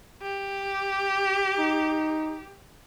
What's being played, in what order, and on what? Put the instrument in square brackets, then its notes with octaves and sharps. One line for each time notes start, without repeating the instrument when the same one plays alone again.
[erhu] G4
[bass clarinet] D#4